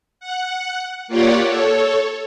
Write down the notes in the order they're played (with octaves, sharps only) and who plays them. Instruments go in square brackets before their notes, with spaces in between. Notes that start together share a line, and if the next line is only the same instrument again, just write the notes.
[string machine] F#5
A#3 F4 G4 C#5 D5 F#5
A4 C#5